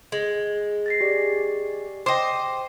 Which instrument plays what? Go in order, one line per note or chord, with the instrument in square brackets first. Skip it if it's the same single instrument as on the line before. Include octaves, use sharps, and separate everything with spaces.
[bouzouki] G#3
[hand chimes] A6 A#6 C7
G4 G#4 D5
[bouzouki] C5 D#5 [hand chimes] G5 D6